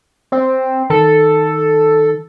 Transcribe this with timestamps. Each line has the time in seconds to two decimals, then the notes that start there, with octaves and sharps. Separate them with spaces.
0.32 C4
0.90 D#3 A4